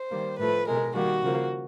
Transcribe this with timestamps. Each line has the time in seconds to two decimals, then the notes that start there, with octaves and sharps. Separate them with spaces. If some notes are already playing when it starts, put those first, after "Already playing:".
Already playing: C5
0.11 D#3 G3 A#3
0.38 A2 F3 A3 B4
0.67 B2 G#3 A#4
0.94 D#3 G3 A#3 F#4
1.22 C#3 F3 A#3